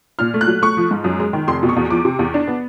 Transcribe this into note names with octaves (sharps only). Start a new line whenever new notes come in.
A#2 F6
A3
F#6
F#3
A3 C#6
F3
G#2
F#2
G#3
D#3
F1 C6
B2
C#6
E2
F3 D6
C3
E2
D4
B3